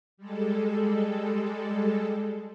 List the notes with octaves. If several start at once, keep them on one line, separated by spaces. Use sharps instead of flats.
G3 G#3 A4